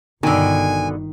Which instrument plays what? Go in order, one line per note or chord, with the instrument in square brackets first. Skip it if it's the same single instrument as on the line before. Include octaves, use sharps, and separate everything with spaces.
[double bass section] G1 [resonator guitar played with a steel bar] B2 D3 [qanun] D#3 [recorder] G#5